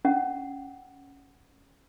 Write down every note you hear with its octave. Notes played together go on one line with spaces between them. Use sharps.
C#4 F#5